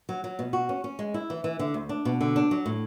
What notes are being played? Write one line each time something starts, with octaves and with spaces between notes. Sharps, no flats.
F#3
F#3
B2
F#4
C#4
C#4
G#3
E4
E3
E3
D3
D2
D4
B2
D3
D4
F#3
A2